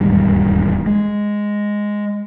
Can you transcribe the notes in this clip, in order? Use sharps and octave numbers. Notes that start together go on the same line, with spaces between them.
E1 D#2 G#2 G3
G#3